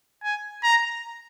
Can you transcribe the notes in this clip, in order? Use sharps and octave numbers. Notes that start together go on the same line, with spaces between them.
G#5
A#5